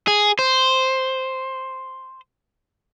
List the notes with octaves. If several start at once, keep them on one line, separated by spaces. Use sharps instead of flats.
G#4
C5